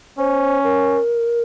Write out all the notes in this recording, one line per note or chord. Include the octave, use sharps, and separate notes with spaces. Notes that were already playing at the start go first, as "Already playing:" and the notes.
C#4 C5
A#4